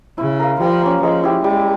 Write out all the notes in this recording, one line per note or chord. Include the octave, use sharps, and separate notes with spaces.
C#3 E4
A#4 F5
F3 G3
A#3 C#4
F3 G#3
E4 G4
G3 G#3